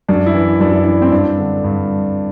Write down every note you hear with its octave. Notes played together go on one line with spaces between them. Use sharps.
F#2 D4
E4
E3
F#2 D4
E4
E3 D4
C4
G2 D4
D3
G2